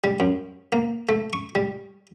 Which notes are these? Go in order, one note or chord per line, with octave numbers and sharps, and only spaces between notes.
G3
F#2
A#3
A3
C#6
G3